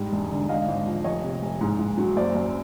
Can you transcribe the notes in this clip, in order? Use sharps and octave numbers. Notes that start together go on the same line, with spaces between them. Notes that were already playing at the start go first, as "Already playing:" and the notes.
Already playing: G#2 G3
E1
D3
G#1 D#5 F5
G#1
F3
F1 C#5 D#5
C3
F1
G#2
G#2
F#3
F#1 C5 D5
F#2